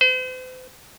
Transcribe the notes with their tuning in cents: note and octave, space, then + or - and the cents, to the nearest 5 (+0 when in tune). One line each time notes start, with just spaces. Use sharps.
C5 -45